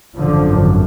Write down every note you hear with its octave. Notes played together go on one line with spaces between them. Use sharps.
G#1 F#2 D3 F3